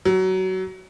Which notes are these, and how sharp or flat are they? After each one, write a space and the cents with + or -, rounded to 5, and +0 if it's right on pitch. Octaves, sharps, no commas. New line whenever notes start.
F#3 +20